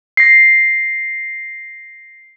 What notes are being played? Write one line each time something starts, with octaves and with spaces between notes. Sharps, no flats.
A#6 C7